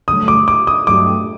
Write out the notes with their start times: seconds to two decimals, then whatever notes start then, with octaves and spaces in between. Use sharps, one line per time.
0.08 G2 D3 F#3 A3 D#6
0.28 D6
0.48 D6
0.67 D#6
0.87 G2 F#3 A3 D4 G4 D6